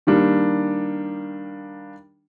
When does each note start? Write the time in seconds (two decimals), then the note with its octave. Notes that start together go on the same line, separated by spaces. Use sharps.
0.07 D#3 G3 A#3 D4